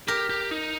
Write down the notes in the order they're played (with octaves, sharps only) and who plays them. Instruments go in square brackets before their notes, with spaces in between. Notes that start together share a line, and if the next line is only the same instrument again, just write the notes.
[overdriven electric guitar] G4 [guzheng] A#4
[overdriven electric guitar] G4
D#4